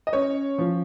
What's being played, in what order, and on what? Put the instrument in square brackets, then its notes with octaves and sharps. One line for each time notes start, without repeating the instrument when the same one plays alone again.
[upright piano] D#5
C#4 C#5
F3